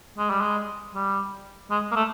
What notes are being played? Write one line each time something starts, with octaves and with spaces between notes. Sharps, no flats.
G#3
G3
G#3
G3
G#3
A#3
A3